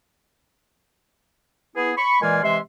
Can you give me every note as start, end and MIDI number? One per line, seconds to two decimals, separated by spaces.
1.75 1.92 59
1.75 1.92 64
1.75 1.92 68
1.97 2.19 83
1.97 2.19 85
2.22 2.40 46
2.22 2.40 52
2.22 2.40 56
2.22 2.40 74
2.22 2.40 77
2.22 2.40 80
2.43 2.58 48
2.43 2.58 52
2.43 2.58 56
2.43 2.58 76
2.43 2.58 84